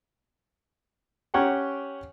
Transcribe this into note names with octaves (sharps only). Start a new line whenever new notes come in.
C#4 G4 C#5 F#5 G5 A#5